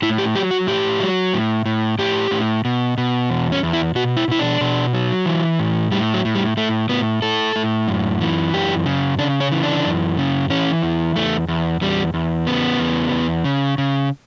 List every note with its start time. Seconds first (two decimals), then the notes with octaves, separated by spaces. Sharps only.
0.02 A2 E4
0.18 G4
0.35 F#3 G4
0.51 F#4
0.67 A2 G4
1.00 F#3
1.33 A2
1.66 A2
1.99 A2 G4
2.31 A2
2.65 B2
2.98 B2
3.30 E2
3.52 C#4
3.63 E2
3.73 E4
3.95 B2 F#4
4.17 E4
4.28 B2 E4
4.39 D4
4.61 B2
4.94 F#3
5.26 E3
5.59 A2
5.92 A2 G3
6.14 F#3
6.25 A2
6.35 G3
6.57 A2 A3
6.89 A2 B3
7.22 A2 A4
7.56 A2
7.88 F#2
8.21 E3
8.54 F#2 G4
8.86 C#3
9.19 C#3 D4
9.40 C#4
9.52 E3
9.63 D4
9.85 F#2
10.17 C#3
10.50 E3 C#4
10.82 E2
11.16 E2 A3
11.48 E2
11.81 E2 G3
12.14 E2
12.47 C#3 B3
12.79 E2
13.12 E2
13.44 C#3
13.78 C#3